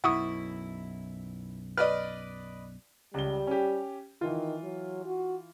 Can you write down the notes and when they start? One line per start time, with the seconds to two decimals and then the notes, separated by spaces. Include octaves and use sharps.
0.04 B1 F#2 B2 E4 F#5 C#6 D#6
1.77 B4 D5 D#5 F6
3.14 C#2 G3 G7
3.47 C#4 G4
4.21 D#3 E3 F4
4.63 F#3
5.05 F#4